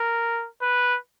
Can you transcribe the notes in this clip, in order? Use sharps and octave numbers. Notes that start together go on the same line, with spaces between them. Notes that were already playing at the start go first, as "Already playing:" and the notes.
Already playing: A#4
B4